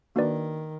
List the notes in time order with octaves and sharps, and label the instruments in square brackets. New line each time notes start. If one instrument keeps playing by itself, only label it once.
[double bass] D#3 [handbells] A#3 D4 F#4 B4 D5